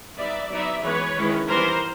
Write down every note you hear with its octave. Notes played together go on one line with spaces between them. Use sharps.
G3 B3 D#4 D5 E5
F#3 B3 D#4 D5 E5
E3 G#3 B3 B4 C#5
D#3 G#3 C#4 E4
E3 G3 B3 A#4 C5